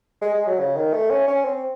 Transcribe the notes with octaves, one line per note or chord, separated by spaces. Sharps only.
G#3
G#3
F#3
C#3
D#3
A3
C#4
C#4
C4